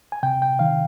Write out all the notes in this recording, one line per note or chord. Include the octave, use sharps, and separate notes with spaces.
G#5
C3 G5
G5
D#3 F5